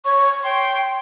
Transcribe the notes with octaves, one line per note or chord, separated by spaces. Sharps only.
C#5 C#6
G5 C6